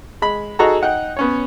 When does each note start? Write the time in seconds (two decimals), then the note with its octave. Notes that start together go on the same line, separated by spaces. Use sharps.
0.22 G#3 B5
0.59 D#4 F#4 G#4 A4 A#5
0.82 D#4 F#5 G5 F#6
1.17 B3 C#4 C#5